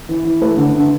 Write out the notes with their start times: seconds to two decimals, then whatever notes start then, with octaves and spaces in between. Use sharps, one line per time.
0.09 E3
0.25 E3
0.41 A3 B4
0.57 D3
0.74 D3